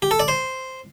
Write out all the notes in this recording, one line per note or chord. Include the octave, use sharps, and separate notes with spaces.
G4
A4
D5
C5